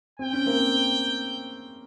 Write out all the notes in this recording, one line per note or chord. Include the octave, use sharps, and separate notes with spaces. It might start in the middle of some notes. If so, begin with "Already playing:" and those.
C4 G5
C#4
A#3 C4